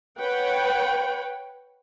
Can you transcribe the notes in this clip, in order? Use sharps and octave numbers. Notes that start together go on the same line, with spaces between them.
B4 C#5 F#5 G5